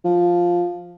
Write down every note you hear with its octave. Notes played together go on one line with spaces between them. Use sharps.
F3